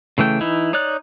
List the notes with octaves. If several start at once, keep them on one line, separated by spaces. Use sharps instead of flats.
C#3 E3 A3 G5
E3 D#4 E4
D#4 C#5 D5 F#6